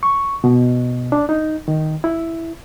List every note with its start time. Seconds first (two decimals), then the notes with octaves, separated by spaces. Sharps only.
0.03 C#6
0.44 B2
1.12 D4
1.29 D#4
1.68 D#3
2.04 E4